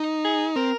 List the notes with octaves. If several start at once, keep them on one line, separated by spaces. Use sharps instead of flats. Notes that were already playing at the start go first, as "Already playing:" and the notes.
Already playing: D#4
G#4
C4 A#4